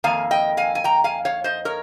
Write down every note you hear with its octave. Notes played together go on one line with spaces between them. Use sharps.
F2 D#3 A#3 F5 G#5
D#5 G5
F5 G#5
G#5
G5 A#5
F5 G#5
C#5 F5
C5 D#5
A#4 C#5